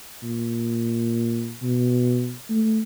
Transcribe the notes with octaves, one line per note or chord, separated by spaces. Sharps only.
A#2
B2
A3